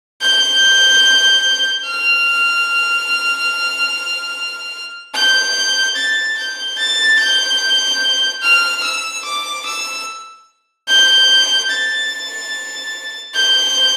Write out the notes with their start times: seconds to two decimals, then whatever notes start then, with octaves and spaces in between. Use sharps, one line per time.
0.22 G6
1.86 F6
5.14 G6
5.96 A6
6.38 G6
6.79 A6
7.19 G6
8.42 F6
8.84 E6
9.25 D6
9.66 E6
10.89 G6
11.70 A6
13.35 G6